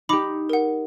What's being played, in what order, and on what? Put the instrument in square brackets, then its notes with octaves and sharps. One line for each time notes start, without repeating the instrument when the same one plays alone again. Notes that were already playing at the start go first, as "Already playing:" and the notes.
[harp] D#4 G4 [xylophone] B5 D6
[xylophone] A#4 F#5